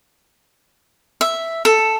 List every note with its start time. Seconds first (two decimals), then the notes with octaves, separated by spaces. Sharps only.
1.21 E5
1.65 A4